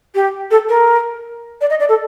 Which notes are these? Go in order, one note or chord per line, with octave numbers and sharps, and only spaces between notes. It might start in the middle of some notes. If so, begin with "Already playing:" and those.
G4
A4
A#4
D5
D#5
D5
A4